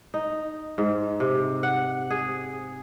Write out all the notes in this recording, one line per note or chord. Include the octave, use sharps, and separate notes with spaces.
D#4
G#2
C3
F#5
G#4